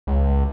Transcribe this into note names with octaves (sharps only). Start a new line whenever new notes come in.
C#2